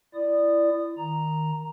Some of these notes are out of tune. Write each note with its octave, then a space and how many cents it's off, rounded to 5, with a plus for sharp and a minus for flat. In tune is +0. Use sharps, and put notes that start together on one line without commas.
E4 +25 D5 +0 D#6 -20
D#3 +0 A#5 +0